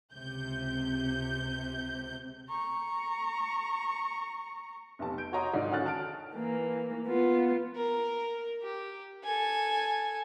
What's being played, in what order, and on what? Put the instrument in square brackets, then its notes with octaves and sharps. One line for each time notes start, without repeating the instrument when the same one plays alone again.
[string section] C#2 C3 G6
[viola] A#5 C#6
[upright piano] F1 B1 C3 A5
G6 D7
F#4 C#5 D#5 A#5 C6 D#6
G#2 D#3 D4 D#4 F4 F#4
D3 C#4 F#4 F6 F#6 A6
A5 F6 A6 D7
[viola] E3 A#3
B3 F4
[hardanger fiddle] A#4
G4
A4 G#5